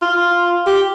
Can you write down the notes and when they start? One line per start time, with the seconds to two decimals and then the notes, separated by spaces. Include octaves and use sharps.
0.02 F4
0.66 G4